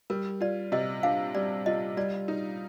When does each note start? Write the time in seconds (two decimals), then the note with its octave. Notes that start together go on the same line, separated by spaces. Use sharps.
0.10 G3 A#4
0.41 F4 D5
0.72 C3 D#5
1.03 D4 F5
1.35 G3 D5
1.66 F4 D#5
1.97 G3 D5
2.28 D#4